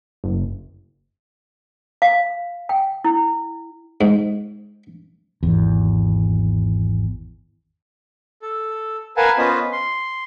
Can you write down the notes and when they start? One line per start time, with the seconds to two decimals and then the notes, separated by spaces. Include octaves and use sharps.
0.24 F#1
2.02 F5
2.69 G5
3.04 E4
4.01 G#2
5.43 G#1 E2
8.42 A4
9.17 A#4 B4 F5 F#5 G#5 A5
9.38 B3 C#4 F4 B4 C5 D#5
9.72 C6